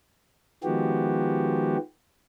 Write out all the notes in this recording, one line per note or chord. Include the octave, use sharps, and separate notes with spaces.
D#3 F3 G#3 B3 F#4 G4